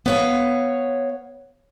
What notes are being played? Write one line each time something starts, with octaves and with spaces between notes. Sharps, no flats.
B3 C#5 F5